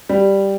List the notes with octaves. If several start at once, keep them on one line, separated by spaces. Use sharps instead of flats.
G3